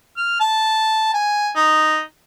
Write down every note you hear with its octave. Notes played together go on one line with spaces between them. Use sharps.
F6
A5
G#5
D#4